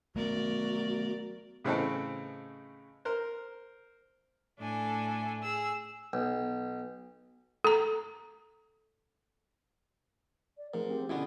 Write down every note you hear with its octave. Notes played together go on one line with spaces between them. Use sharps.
F#3 A3 B3 F#4 A#4 D5
A2 C#3 E3 C4 D#4 A4
A#4 C5
A2 D4 A4 G#5
G#4 E6
B1
A4 A#5
D5
G#2 F3 A3 C4 A#4
C4 G4
B2 D3 B3 C#4 E4 F#4 D5